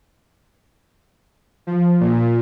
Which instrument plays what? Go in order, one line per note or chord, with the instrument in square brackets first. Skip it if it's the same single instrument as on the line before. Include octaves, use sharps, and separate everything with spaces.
[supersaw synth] F3
A#2